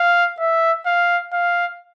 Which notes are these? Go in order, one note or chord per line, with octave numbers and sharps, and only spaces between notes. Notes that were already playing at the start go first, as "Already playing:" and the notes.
Already playing: F5
E5
F5
F5